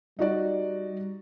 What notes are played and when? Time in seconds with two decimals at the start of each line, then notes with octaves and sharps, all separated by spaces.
0.19 G3 D#4 F#4 D5